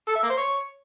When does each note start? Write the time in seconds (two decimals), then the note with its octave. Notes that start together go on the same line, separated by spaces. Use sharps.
0.08 A4
0.16 E5
0.23 A#3
0.30 C5
0.38 C#5